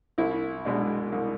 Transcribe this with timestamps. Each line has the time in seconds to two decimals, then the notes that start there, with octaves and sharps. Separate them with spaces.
0.18 C2 E4
0.65 B2 G#3 D4
1.12 C2